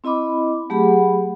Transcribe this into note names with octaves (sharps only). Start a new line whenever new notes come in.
C4 E4 D#5 B5 D6
F#3 A3 G4 G#4 F#5 B5